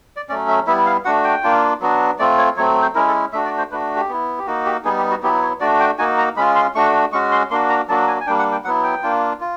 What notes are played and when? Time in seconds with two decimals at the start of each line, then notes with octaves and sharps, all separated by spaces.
0.16 D5
0.29 F#3 A3 C#4 D5
0.48 E5
0.67 G3 B3 E4 E5
0.86 F5
1.05 A3 D4 F#4 F#5
1.24 G5
1.43 A#3 D4 F4
1.81 F#3 B3 D4 F#4
2.19 A3 C4 F4 D5
2.38 C#5
2.57 F#3 A3 C4 C#5
2.82 C5
2.95 G#3 C#4 E4 A#4
3.08 A4
3.33 A3 D4 F#4 E5
3.45 D5
3.58 C5
3.71 A3 D4 F#4 B4
3.96 G4
4.09 B3 E4
4.39 G4
4.46 A#3 D#4 F#4
4.66 G4
4.84 G3 B3 D#4 G#4
4.97 G4
5.10 F#4
5.23 F#3 B3 E4 G4
5.42 C#5
5.60 A3 D4 F#4 D5
5.80 G5
5.98 A#3 D#4 F#4 G#5
6.18 A#5
6.36 G#3 C#4 F4 B5
6.56 C6
6.75 A3 D4 F#4 C#6
7.13 G#3 C#4 F#4 C#6
7.32 C6
7.51 A#3 D4 F#4 C6
7.69 A#5
7.88 F#3 A#3 D4 F#4 A5
8.08 G#5
8.21 G#5
8.27 G3 A#3 D4 G5
8.39 F#5
8.52 G5
8.64 F#3 B3 E4 F#5
8.83 G5
9.03 A#3 D4 F4
9.40 F4